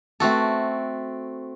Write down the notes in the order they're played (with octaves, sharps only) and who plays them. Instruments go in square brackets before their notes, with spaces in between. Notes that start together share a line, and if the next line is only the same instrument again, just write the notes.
[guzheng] A3 C4 F#4 A4